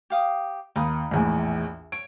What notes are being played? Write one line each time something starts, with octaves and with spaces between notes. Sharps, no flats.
G4 F5 D#6
D#2 D#4 B5 D#6
A#1 E2 A2
C#5 D7